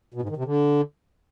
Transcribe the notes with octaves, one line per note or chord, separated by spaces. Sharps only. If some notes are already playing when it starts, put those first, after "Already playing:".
B2
G#2
D#3
C3
D3